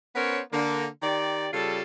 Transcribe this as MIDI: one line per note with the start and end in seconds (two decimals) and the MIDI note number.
0.15 0.40 59
0.15 0.40 61
0.15 0.40 70
0.15 0.40 72
0.15 0.40 73
0.52 0.86 50
0.52 0.86 58
1.03 1.48 51
1.03 1.48 67
1.03 1.48 74
1.53 1.82 49
1.53 1.82 55
1.53 1.82 65
1.53 1.82 69